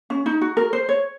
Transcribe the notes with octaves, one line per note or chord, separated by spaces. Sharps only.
C#4
D#4
F#4
A#4
C5
C#5